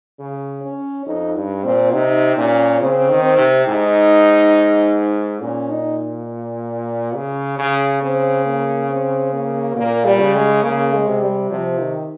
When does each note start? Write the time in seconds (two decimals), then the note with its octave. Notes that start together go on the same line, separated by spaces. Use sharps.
0.20 C#3
0.62 C#4
1.06 F2 D#4
1.36 G2
1.64 A#2 C4
1.93 C3 D#4
2.37 A#2 C#4
2.81 C#3 C4
3.09 D#3
3.23 C4
3.38 C3
3.67 G#2 D#4
5.41 A#2 C#4
5.70 D#4
7.15 C#3
7.59 C#3
8.02 C#3 C4
8.46 A#3
8.90 C4
9.33 A#3
9.76 A#2 A#3
10.05 G3
10.20 C#3
10.35 G#3
10.64 C#3 A#3
10.93 G#3
11.07 C3
11.22 G3
11.50 C3 F3
11.79 D#3